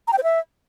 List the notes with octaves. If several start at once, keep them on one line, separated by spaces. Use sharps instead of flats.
A#5
G5
C5
E5